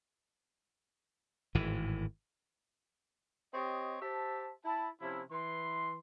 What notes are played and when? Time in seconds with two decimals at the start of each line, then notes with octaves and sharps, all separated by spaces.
1.55 G#1 A2 E3
3.53 C4 G4 C#5 D#5
4.01 G4 C5 E5 A5
4.64 E4 A5
5.01 C3 F3 C#4 E4
5.30 E3 C6